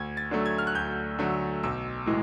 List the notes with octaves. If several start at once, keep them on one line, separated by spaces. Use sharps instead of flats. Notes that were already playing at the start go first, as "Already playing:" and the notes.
Already playing: D2 G#6
A6
D3 F#3 A3
G#6
F6
F#6
D2 G6
D3 F#3 A3
B1 E6
A2 E3 G#3